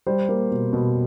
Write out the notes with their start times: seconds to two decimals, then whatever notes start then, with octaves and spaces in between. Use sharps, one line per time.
0.07 G3 C5
0.29 A#3
0.51 B2
0.73 B2